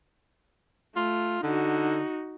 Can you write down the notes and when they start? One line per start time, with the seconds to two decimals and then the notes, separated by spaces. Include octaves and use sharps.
0.96 A3 F4
1.43 D3 D#4 F#4